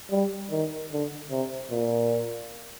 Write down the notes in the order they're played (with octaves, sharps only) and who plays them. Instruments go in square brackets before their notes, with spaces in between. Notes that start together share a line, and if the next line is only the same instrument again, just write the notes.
[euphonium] G3
D#3
D3
C3
A#2